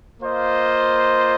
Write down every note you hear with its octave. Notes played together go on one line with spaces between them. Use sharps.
A#3 F4 C5 D#5